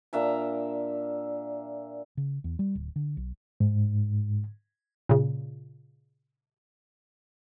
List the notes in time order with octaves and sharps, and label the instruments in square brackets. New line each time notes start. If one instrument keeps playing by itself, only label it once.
[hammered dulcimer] A#2 D4 E5 A#5
[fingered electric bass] C#3
E2
G3
D1
D3
B1
[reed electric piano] G#2
[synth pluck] A#2 C#3